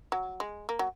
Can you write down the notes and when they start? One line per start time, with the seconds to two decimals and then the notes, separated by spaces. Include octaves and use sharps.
0.12 F#3
0.40 G#3
0.69 A#3
0.79 F#3